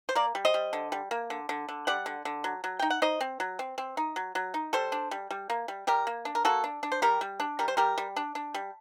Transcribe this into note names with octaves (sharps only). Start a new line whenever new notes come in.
C5
A#3 A#4 D5
G3
C5 D#5
G3
D3
G3
A#3
D3
D3
D3
G3 D5 F#5
D3
D3
F#3
F#3
D#4 G5
F#5
D#4 C5 D#5
C4
F#3
C4
C4
D#4
F#3
F#3
D#4
G3 A4 C5
D4
G3
G3
A#3
G3
G3 G4 A#4
A#3
D4
A#4
A#3 F#4 A4
D4
D4
C5
G3 G4 A#4
G3
D4
G3 A#4
C5
G3 G4 A#4
G3
D4
D4
G3